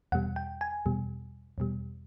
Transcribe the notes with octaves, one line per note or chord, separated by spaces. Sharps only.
E2 B2 G3 F#5
G5
G#5
E2 B2 G3
E2 B2 G3